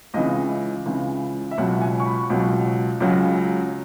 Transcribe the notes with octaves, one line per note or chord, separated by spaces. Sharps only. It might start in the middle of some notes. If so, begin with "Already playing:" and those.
C#2 C#3 E3 D#5
C#2 C#3 E3
E5
C#2 B2 F#3 F#5
F#5
G#5
C#6
B5
C#2 B2 F#3
C#2 C#3 F#3